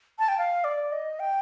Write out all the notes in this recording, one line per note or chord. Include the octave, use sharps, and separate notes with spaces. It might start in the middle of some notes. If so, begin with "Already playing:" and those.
A5
G5
F5
D5
D#5
G5